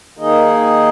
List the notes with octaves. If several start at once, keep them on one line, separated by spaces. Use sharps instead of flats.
D#3 A#3 D#4 G#4 D#5